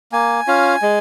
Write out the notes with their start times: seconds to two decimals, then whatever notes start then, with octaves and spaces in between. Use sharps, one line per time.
0.12 A#3 G#5
0.47 C#4 F4
0.82 G#3